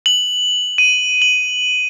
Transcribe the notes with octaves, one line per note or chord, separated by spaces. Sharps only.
F#7
D#7
F#7